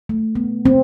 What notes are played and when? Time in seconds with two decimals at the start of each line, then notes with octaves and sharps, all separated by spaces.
0.09 A3
0.36 B3
0.66 C4